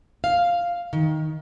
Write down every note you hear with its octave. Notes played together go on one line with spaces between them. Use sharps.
F5
D#3